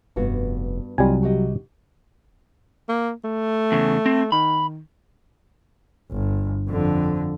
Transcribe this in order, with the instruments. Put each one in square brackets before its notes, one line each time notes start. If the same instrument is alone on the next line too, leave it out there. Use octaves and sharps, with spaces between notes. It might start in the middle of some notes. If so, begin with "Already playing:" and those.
[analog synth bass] F1 [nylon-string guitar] G2 B3 F#4
[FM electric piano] C2 [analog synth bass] F#3 [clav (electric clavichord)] G3 G#5 [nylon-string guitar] F4 F#4 D#5
[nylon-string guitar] F#4 G4 D#5
[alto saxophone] A#3
A3
[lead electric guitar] E2 C#3
C4
[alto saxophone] D#3 [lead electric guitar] B5
[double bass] G1
F2 D3